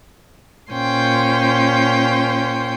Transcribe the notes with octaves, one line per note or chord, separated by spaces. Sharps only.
A#2 C#4 C5 G5 C6